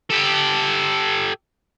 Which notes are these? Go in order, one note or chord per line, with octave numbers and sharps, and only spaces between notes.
G4 A4